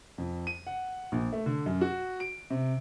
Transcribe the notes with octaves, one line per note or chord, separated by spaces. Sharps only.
F2
D#7
F#5
A#1
A3
D3
F#2
F#4
D7
C3